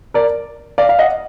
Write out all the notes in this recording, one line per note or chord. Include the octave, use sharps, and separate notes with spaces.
A#4 D5
D5 F5
F5
D#5 F#5